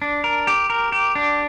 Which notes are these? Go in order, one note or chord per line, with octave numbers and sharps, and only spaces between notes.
D4
A#4
G4
A#4
G4
D4